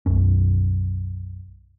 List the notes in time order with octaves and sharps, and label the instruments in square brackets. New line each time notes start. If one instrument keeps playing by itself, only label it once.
[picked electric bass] B1 F#2 C#4